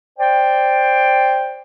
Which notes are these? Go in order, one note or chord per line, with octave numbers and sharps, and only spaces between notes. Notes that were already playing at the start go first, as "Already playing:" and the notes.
C5 D5 G5